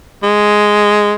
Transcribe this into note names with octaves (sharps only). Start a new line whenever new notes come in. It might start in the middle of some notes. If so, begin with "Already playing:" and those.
G#3